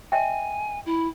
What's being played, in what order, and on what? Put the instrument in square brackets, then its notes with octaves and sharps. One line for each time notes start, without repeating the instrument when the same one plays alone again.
[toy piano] D#5 E5 G5 [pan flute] G#5
[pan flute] E4